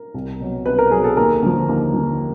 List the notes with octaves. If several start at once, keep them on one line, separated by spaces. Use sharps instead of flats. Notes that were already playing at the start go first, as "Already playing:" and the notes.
Already playing: A#4
C2
B2 F#3
C2 B4
A#4
B2 F#3 G#4
A4
D#2 A#4
D3 F3
D#2
D3 F3